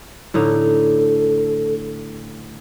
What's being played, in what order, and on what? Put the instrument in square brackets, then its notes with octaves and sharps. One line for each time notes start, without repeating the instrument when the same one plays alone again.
[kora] A2 D3 D#4 [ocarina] A4